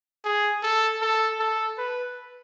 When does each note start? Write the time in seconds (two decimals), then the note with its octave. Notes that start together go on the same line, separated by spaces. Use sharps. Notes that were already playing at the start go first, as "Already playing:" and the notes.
0.25 G#4
0.63 A4
1.02 A4
1.40 A4
1.78 B4